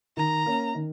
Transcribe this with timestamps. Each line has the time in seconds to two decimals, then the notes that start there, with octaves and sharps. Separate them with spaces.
0.17 D#3 A#5
0.46 A#3 C#4
0.75 D#3